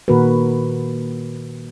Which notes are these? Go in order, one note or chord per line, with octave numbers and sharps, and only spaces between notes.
A#2 D#3 A#3 F#4 A#4 B4